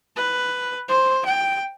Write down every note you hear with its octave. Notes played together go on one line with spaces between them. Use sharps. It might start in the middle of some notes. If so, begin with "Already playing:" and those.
B4
C5
G5